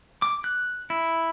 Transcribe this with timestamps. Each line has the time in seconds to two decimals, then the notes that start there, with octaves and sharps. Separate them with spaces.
0.22 D6
0.44 F#6
0.90 E4